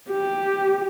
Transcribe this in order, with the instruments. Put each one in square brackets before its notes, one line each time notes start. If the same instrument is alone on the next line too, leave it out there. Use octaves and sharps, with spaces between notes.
[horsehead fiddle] G4